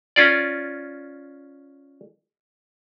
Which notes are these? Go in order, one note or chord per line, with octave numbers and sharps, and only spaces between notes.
C#4 F4 D5